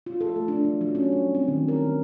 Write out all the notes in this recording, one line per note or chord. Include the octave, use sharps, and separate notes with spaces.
F4
A4
A3
D4
F#3
F#3
C#4
G3
C4
D#3
A#4
D#3